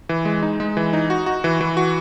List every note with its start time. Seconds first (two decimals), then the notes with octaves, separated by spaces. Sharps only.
0.09 E3
0.25 G#3
0.43 D#4
0.60 G#3
0.77 E3
0.93 D#4
1.10 F#4
1.26 F#4
1.44 E3
1.61 E3
1.77 F#4